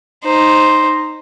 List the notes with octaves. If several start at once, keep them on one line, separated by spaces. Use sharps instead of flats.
D#4 C5